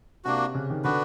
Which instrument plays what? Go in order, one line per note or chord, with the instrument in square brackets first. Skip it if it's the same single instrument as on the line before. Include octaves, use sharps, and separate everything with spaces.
[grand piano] C3 [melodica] A#3 D4 F#4
[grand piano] C#3
D#3
[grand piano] D3 [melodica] B3 D4 F#4 B4